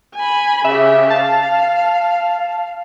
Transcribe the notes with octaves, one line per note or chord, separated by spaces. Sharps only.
G#5 B5
C#3 G4 E5
F5 A5